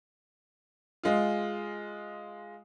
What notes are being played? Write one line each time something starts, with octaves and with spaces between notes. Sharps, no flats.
G#3 F4